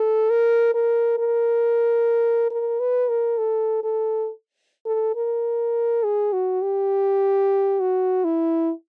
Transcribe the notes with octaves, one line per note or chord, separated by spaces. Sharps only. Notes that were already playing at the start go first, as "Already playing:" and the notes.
Already playing: A4
A#4
A#4
A#4
A#4
B4
A#4
A4
A4
A4
A#4
G#4
F#4
G4
F#4
E4